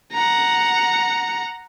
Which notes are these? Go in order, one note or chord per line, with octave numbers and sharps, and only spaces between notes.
F#5 A#5